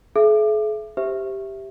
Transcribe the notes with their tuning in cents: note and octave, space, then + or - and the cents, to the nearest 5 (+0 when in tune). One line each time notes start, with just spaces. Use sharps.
G#4 +45 E5 +25
G4 +0 C5 -10 E5 +0